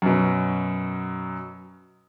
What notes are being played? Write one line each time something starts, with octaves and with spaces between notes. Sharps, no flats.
F#2 B2